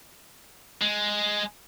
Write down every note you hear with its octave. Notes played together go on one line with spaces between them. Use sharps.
G#3